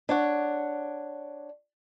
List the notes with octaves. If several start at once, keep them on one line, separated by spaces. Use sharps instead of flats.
D4 C#5 F#5